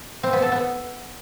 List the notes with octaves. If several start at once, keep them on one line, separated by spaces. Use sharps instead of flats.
C4
B3
A4
B3